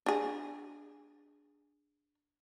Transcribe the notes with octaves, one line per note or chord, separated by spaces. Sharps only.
D4 G#4